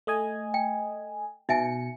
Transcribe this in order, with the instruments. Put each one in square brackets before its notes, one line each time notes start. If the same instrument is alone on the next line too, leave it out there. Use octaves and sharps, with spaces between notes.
[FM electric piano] A3 D#5 G#5
[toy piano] G5
[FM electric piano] B2 C#7 [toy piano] D#4 E5 G#5